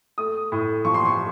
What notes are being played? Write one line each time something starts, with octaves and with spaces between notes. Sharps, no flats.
A3 D#6
A2
F3 C#6
C6
C#6